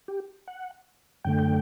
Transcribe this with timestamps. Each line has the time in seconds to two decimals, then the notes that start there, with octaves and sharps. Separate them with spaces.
0.08 G4
0.47 F#5
1.25 F#2 D3 A3 G5